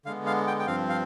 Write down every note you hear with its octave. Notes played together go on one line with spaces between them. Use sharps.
D3 G#3 B3 F5
F5
G5
G5
G2 F3 C4 F5
F5